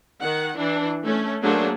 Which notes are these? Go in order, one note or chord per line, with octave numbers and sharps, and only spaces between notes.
D#3 F#5
E3 D4
A3 C#4
F#3 A3 A#3 D4 G#4 C5